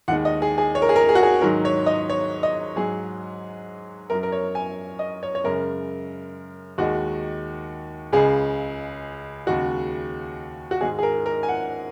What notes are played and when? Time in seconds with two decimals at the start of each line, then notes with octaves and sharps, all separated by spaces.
0.08 D#2 D#3 G#3 F#5
0.25 D#5
0.42 G#4
0.58 G#4
0.75 C#5
0.82 A#4
0.89 G#4
0.96 A#4
1.09 G#4
1.15 F#4
1.23 G#4
1.41 G#2 D#3 F#3 A#4
1.65 C#5
1.86 D#5
2.10 C#5
2.43 D#5
2.76 G#2 F#3 G#4
4.10 F#2 F#3 A#4
4.23 A#4
4.32 C#5
4.55 G#5
4.99 D#5
5.23 C#5
5.35 C#5
5.44 F#2 C#3 G#3 A#4
6.78 D#2 D#3 G#3 F#4
8.12 C#2 C#3 G#3 G#4
9.47 D#2 C#3 G#3 F#4
10.71 F#4
10.81 G#2 D#3 G#3 G#4
10.99 G#4
11.03 A#4
11.26 A#4
11.43 G#5
11.48 F#5